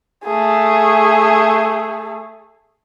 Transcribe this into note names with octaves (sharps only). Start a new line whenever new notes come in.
A3 G#4